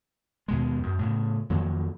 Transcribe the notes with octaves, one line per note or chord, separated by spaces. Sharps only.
D#2 B2 G#3
F#2
A2 C#3
F2 D#3 F#3 A#3